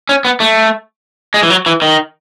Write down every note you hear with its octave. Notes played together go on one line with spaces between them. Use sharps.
C#4
B3
A3
G#3
E3
F#3
E3
D#3